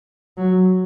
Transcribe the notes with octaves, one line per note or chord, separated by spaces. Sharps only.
F#3